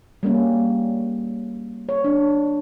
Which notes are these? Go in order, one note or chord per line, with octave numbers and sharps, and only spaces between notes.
G3 A#3 C#4
C#5
D4